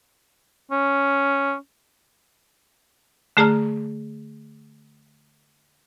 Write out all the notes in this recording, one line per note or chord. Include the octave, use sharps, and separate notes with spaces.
C#4
D3 A3 G#4 A5 A#5 F6